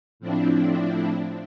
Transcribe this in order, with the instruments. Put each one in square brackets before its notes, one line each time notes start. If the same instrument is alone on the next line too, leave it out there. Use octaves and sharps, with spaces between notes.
[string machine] A2 F3 C4 D4 E4